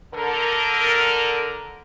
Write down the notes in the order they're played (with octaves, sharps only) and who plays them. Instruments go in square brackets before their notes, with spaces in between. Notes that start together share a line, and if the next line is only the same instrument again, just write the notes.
[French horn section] D3 A#4